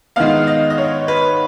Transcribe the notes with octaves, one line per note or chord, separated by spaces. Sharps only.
D#3 G#3 B3 F5
D#5
D#5
C#5
B4